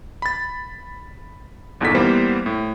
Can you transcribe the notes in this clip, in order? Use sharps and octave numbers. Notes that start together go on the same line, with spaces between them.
B5 A6
G1 E2 A#2 D#4 A4 B6
E3 G3 A#3 B3 C5
A2